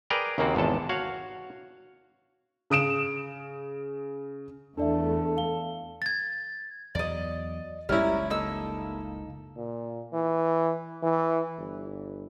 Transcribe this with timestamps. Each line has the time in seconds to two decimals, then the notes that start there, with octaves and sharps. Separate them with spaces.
0.10 G#4 A#4 B4 D5 G5 A#5
0.38 D#2 C#3 A#3 C4 F#4
0.55 G#1 E2 C3 A4 A5
0.89 F#4 C#5 F5
2.70 C#3 D#6 D7 E7
4.78 E2 A3 D4 A4 D5 E5
5.37 F5 G7
6.02 G#6 A6
6.95 E2 F#3 D5 D#5
7.89 F#1 C#2 F#2 G3 C#4 E4 A#4 E5
8.30 A#3 D#4 A4 E6
9.56 A#2
10.13 E3
11.03 E3
11.57 G1